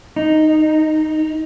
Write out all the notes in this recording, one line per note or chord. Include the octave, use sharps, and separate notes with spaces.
D#4